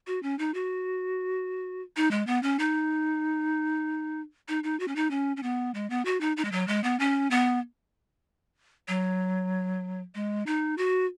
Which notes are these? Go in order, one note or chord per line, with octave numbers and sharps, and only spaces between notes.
F#4
C#4
D#4
F#4
D#4
G#3
B3
C#4
D#4
D#4
D#4
F#4
C#4
D#4
C#4
C#4
B3
G#3
B3
F#4
D#4
D#4
G#3
F#3
G#3
B3
C#4
B3
F#3
G#3
D#4
F#4